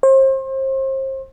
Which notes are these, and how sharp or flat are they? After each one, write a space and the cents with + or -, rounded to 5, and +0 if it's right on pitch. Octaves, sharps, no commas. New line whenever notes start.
C5 +35